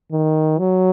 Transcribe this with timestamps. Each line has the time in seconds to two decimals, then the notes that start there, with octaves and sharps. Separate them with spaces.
0.12 D#3
0.58 F#3